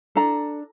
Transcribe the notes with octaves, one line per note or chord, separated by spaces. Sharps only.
D4 A4 A#5